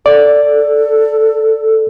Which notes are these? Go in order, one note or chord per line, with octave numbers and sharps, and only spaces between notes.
A4 D5